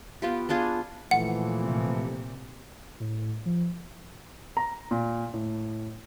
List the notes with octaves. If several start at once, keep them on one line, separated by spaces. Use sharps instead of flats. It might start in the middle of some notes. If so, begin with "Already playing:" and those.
B3 F4 G4
B3 D4 F4 G#4
A#2 E3 F3 A3 F#5
C3
A2
F3
A#5
A#2
A2